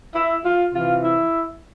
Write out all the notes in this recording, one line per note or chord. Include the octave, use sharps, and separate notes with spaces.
E4 E5
F4 F5
C3 E3 F4 F5
E4 E5